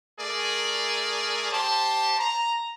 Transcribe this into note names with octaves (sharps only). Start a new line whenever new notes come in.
A3 G#4 A#4 D5
G4 C5 A5
A#5